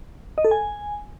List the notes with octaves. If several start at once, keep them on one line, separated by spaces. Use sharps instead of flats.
D#5
A4
G#5